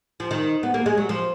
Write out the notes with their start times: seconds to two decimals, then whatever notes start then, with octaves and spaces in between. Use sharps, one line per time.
0.20 F3
0.31 D#3
0.63 B3
0.74 A#3
0.86 G#3
0.98 F#3
1.09 F3